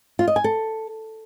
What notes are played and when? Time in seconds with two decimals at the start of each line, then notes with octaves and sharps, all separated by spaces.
0.19 F4
0.28 D#5
0.36 G#5
0.44 A4